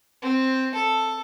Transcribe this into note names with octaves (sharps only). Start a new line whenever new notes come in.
C4
A4